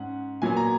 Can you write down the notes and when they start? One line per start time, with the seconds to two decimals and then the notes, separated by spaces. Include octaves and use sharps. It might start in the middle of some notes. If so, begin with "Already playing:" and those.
Already playing: G#2 C#4 F#5
0.42 A#2 F#3 B3 G#5
0.57 A#5